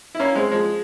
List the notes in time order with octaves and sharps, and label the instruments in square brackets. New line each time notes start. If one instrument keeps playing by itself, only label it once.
[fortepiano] E4
A#3 C#4
G#3 C4
F3 G#3